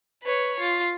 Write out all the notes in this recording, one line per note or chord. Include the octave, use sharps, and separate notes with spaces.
B4 C#5
F4